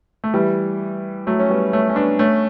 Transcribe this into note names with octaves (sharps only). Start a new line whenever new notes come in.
A3
E3 G3
F#3 A3
C#4
G3 B3
A3 C#4
C#4
B3 D4
A3 C#4